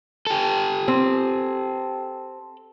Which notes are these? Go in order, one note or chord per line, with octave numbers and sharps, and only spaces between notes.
G4 A4
C4